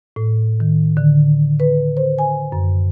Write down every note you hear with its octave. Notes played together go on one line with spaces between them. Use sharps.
A2
D#3
D3
B4
C5
G#5
F#2